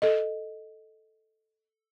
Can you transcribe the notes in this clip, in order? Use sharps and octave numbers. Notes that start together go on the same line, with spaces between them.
A4 D#5